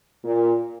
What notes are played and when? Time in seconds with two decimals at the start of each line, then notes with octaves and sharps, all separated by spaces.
0.23 A#2